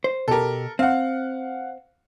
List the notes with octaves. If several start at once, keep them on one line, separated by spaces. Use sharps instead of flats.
C5
B2 G4 A4 A#4
C4 F5 F#5